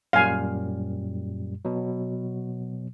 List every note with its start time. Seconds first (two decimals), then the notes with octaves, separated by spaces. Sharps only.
0.13 F#2 A#2 G3 F5 G#5
1.65 B2 F#3